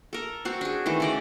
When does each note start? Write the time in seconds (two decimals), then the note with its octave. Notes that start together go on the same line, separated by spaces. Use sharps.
0.13 A4 A#4
0.45 C4 F#4
0.61 D4 G#4
0.86 D#3 E3 A3
1.00 C#3 D5 D#5